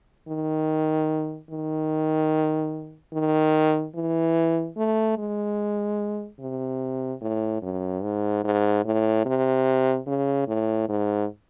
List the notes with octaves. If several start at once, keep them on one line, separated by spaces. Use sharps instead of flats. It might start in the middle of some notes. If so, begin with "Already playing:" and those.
D#3
D#3
D#3
E3
A3
G#3
C3
A2
F#2
G#2
G#2
A2
C3
C#3
A2
G#2